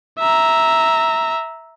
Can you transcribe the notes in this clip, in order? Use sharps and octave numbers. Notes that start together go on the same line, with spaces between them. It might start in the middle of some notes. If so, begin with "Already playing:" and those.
E5 A#5